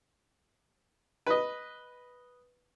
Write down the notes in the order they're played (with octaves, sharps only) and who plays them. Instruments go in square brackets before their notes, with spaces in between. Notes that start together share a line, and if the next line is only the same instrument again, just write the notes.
[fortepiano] B4 D#5